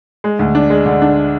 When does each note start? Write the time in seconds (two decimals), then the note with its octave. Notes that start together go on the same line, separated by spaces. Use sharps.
0.24 G#3
0.39 D2
0.55 D4
0.70 G#3
0.86 D3
1.02 D4